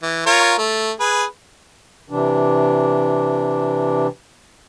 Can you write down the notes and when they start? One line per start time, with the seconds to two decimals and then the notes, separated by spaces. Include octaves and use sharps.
0.02 E3
0.26 F4 A#4 C#5
0.58 A3
1.00 G#4 B4
2.10 C3 E3 D4